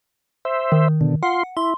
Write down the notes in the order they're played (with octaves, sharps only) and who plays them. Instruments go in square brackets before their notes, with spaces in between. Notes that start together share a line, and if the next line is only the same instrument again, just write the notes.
[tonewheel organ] C5 E5
[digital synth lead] D#3
[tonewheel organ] B2 D3
[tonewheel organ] F4 C6 [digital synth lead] F#5
[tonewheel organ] E4 [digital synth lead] C6